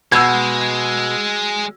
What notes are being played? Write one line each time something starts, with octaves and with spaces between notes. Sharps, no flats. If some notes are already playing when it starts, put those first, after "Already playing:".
B2 G#3 E6 G#6